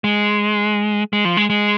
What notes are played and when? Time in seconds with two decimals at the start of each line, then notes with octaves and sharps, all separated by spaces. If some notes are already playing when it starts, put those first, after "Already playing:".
0.04 G#3
1.13 G#3
1.25 F3
1.37 G#3
1.50 G#3